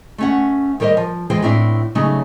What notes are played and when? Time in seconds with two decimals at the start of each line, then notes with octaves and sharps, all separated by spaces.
0.18 A3 C#4 F#5
0.80 D#3 G3 A#4 C5 D#5
0.97 F3
1.30 E2 E3 G#3 F4 C5 G5
1.42 A2 B3 C4 D4 E4
1.95 C#3 F#3 G3 A3 D#4